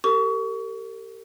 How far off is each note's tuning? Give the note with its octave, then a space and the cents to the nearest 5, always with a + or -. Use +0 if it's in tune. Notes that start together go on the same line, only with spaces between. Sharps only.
G4 +0 A#4 -40 C#6 +30